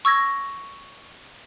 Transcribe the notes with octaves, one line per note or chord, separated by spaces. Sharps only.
C#6 E6 G#6 A#6